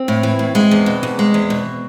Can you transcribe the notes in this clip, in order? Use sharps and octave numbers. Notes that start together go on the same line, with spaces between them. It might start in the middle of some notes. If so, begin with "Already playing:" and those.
Already playing: C4
A2
E3
A2
G#3
E2
B2
E2
G#3
E2
B2